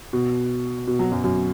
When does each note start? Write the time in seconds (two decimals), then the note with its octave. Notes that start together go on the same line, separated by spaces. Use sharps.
0.13 B2
0.87 B2
0.99 F#3
1.12 F#2
1.24 F#2